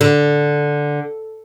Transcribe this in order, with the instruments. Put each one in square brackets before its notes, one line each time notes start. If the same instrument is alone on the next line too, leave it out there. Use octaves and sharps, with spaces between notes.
[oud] D3